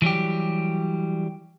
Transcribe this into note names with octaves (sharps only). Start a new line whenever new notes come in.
E3 F#3 G3 G4